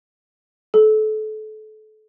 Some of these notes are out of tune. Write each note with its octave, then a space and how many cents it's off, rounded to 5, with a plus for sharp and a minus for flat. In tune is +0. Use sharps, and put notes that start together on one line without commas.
A4 -30